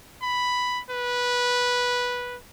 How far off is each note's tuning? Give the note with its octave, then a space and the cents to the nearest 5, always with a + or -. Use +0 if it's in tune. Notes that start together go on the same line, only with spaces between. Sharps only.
B5 +5
B4 -10